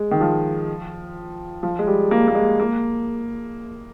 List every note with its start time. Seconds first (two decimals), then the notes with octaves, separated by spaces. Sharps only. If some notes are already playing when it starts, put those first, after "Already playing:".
Already playing: G#3
0.11 D#3
0.21 F3
1.63 F3
1.79 G#3
1.87 G3
2.11 A#3
2.28 A#3
2.35 G#3
2.60 A#3